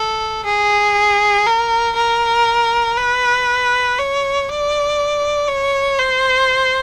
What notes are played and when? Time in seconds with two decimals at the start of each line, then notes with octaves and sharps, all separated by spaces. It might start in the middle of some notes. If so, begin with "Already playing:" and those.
Already playing: A4
0.45 G#4
1.46 A#4
1.96 A#4
2.97 B4
3.98 C#5
4.49 D5
5.48 C#5
5.99 C5